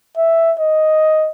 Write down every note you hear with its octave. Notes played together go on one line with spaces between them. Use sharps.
E5
D#5